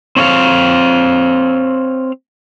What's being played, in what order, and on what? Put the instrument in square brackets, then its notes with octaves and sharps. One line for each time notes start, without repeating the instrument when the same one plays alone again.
[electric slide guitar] C4 C#5 D#5 F5